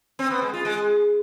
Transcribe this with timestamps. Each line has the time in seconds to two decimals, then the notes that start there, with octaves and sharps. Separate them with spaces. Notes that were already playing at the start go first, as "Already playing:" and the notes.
0.19 C4
0.30 B3
0.42 G#3
0.53 F4
0.65 G#3